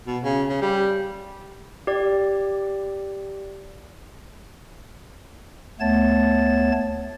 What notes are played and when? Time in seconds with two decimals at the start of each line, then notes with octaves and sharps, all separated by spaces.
0.07 B2
0.23 C#3
0.49 C#3
0.62 G3
1.87 G4 D5
5.80 D2 A3 B3 C#5 A5 A6